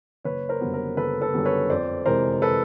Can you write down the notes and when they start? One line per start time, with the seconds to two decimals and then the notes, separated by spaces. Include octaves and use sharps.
0.24 F#1 B4 C#5
0.49 A#4 C5
0.61 F#2 D3 G3 B3
0.74 A#4
0.97 F#1 A4 B4
1.21 A4 B4
1.34 F#2 D3 G3 B3
1.45 B4 C#5
1.70 F2 C5 D5
2.06 C3 E3 G#3 A#4 C5
2.42 A4 B4